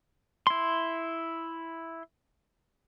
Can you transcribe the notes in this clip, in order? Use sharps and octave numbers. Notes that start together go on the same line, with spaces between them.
E4 C6